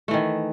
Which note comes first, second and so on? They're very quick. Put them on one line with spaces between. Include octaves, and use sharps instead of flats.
A3 E3 D#3